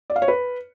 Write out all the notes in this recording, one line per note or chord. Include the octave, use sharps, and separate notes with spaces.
D5
F5
C#5
B4